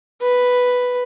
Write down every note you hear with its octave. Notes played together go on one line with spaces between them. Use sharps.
B4